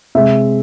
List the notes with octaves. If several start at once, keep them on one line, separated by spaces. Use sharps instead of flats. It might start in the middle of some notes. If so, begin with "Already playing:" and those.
C3 G#3 E5